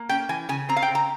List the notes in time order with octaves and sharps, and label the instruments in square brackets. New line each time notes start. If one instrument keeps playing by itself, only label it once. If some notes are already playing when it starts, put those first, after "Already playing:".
Already playing: [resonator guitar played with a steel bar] A#3
C#4 G5
E3 G#5
C#3 G#5
C4 A#5
F5
G5
C#3
A#5